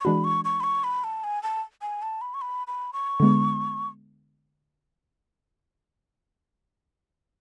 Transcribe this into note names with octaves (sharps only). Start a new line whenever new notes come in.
C#6
E3 G#3 D4 F#4 B5
C#6
C#6
B5
C#6
B5
A5
G#5
A5
G#5
A5
B5
C#6
B5
B5
C#6
D3 G#3 B3